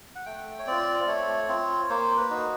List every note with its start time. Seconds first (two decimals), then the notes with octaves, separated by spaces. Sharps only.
0.15 F#5
0.26 A3 G5
0.59 C#5
0.67 C4 F4 D5
1.08 A3 C#5
1.49 C4 F4
1.90 A#3 C5
2.17 B4
2.30 D#4 F#4